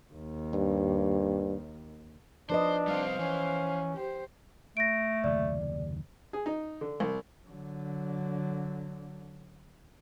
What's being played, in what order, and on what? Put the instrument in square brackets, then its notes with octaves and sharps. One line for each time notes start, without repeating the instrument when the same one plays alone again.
[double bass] D#2
[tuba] G2
[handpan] F3 B4 D#5 [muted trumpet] D4 [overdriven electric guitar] C5
[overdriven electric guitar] G3 C4 [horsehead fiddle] C5 F5
[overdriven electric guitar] E3 [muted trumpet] C#4
[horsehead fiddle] G4 C5
[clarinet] A3 [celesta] A#6 D7
[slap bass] F#1 D#2 C3 [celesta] D5
[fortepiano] G#4
D#4
D3
C2
[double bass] D3 F#3